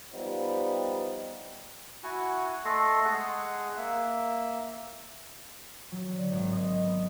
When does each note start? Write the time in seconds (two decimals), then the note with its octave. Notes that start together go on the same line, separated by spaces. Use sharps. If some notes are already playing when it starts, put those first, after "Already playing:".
0.14 F3 G3 B3 D#4
2.04 E4 F#4 F#5 G#5
2.65 A3 A4 D#5 C6
3.04 G#3 G#4 F#5
3.77 A#3 E5
5.92 F#3
6.11 D3
6.32 G#1
6.53 D#5
6.84 B3